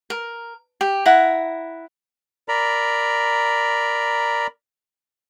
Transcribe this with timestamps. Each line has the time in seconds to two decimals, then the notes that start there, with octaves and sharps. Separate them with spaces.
0.10 A#4
0.81 G4
1.06 E4 F#5 A#5
2.48 A#4 D5 A#5 B5